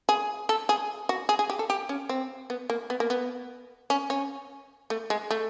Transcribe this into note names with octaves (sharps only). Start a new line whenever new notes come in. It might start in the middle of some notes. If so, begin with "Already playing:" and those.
G#4
A4
G#4
F#4
G#4
G#4
G4
A4
G4
C#4
C4
B3
A#3
B3
A#3
B3
C#4
C#4
A3
G#3
A3